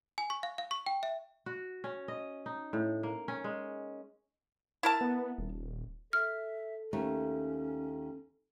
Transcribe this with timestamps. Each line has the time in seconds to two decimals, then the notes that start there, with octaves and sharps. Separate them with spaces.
0.18 G#5
0.30 C#6
0.43 F5
0.58 F5
0.71 C#6
0.86 G5
1.03 E5
1.46 F#4
1.84 C#4
2.08 D#5
2.46 D#4
2.73 A2
3.03 A#3
3.28 C#4
3.44 G#3
4.83 E4 A#4 A5
5.01 B3
5.38 D#1
6.13 A4 E5 F6
6.93 D#2 A3 C#4